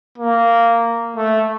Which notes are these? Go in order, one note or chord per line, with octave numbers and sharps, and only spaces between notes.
A#3
A3